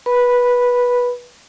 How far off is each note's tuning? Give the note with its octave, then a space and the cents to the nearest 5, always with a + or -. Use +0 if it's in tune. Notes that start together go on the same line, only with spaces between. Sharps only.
B4 -15 B5 +0